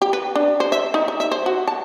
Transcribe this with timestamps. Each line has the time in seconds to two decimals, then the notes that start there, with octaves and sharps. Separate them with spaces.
0.02 G4
0.13 B4
0.36 D4
0.60 C5
0.72 E5
0.94 D#4
1.08 E5
1.20 E5
1.32 C5
1.46 F#4
1.68 A5